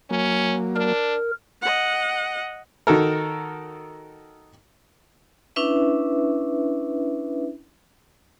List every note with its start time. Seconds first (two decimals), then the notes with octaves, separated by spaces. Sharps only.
0.11 F#3 A#3 C#4
0.76 D4 A#4
1.62 D#5 F#5
2.87 D#3 F#4 A4 A#4
5.56 C#4 D4 E4 B4 E5